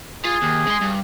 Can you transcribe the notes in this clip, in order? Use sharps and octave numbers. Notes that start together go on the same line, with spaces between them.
F4 G#4
D#2
G#3 C6
G2